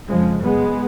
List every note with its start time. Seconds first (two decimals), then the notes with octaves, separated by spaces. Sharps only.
0.08 F2 C#3 F3 G#3
0.42 F#2 C#3 G#3 B3